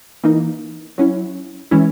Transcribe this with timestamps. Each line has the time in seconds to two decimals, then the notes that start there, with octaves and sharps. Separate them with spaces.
0.23 E3 A#3 D#4
0.98 F#3 C#4 E4
1.71 E3 G#3 C#4 E4